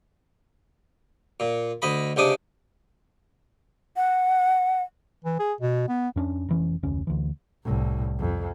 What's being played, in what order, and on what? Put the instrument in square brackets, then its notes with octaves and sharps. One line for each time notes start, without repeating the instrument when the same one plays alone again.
[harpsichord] A#2
D2 D#5 B5
C#2 C3 D4 D#6
[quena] F#5
[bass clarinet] E3
G#4
B2
B3
[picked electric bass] F2 C#4 D4
F1 E3 C#4
F1 D2 C#4
D2 E3
[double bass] C2 A2
F2